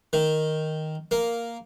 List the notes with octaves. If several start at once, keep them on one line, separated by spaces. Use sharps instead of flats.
D#3
A#3